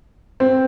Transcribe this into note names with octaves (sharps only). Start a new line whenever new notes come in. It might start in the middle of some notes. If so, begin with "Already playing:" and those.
C4